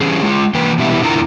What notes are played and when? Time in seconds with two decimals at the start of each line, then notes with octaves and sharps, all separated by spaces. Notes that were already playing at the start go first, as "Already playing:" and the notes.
0.01 D3 E3 G3 C#4 G#4
0.23 G#3 F4
0.55 E3 A#3 B4 G5
0.78 B2 E3 G3 E4
1.02 E2 D3 E4 F4 A#4 A#5